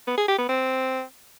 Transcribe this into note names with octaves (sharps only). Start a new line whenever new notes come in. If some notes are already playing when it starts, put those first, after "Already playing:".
B3
G#4
G4
B3
C4